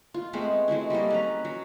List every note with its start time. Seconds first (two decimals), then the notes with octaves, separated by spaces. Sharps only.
0.14 F4
0.33 G#3 A3 B3 C4
0.68 F#3 G#3 A3 E4
0.90 G3 A#3 A4 D#5
1.10 C#4 B4 A#5
1.45 F#3